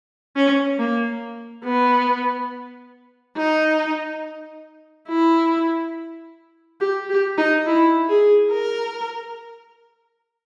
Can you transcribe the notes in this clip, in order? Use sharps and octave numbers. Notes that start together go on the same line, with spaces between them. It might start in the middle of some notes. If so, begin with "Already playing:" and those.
C#4
A#3
B3
D#4
E4
G4
G4
D#4
E4
G#4
A#4